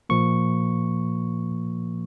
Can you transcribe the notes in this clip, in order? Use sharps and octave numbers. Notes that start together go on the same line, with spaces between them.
A#2 F3 A#3 C#6